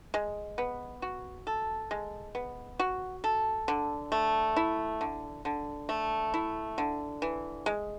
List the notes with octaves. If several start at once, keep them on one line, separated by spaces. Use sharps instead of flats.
G#3
B3
F#4
A4
G#3
B3
F#4
A4
D3
A3
E4
D3
D3
A3
E4
D3
E3
G#3